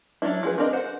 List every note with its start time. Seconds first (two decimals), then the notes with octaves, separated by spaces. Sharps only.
0.22 F#3 C#4 D4 E4
0.43 F3 G#4 B4
0.58 C4 D4 A#4 B4 D#5
0.73 C5 F#5